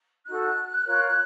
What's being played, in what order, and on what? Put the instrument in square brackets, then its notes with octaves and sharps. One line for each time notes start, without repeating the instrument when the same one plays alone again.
[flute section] D#4 F#4 A4 F#6
F4 A#4 C#5